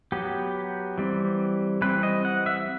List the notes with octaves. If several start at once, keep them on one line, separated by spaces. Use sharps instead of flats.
F#3 B3 G4
E3 G3 C4
E3 G3 C4 B4
D#5
F#5
E5